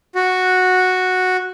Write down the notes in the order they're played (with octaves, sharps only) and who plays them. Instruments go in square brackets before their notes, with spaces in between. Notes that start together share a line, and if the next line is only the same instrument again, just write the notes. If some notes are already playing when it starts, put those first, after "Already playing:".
[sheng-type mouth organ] F#4